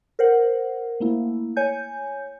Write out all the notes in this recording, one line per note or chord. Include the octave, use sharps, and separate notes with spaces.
A#4 C5 F#5
A3 A#3 E4
C#5 G#5 G6